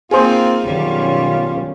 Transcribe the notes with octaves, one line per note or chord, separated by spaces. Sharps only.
A#3 C4 D#4 F4 G#4 C5
F#2 B2 D#3 G3 C#4 F4